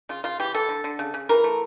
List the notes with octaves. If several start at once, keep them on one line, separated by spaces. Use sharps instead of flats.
C#3 F4
C#3 F4
E3 G4
E3 A4
D3
D3
C#3
C#3
E3 A#4
A3